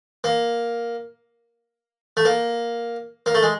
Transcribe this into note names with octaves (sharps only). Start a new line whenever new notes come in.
A#3
A3
A#3
A#3
A3
G#3